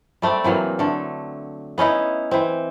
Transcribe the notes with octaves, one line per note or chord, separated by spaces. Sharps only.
G3 A3 C4 D5
C3 E3 F#3 A#3
D3 A3
B3 C#4 D#4 E4
E3 C4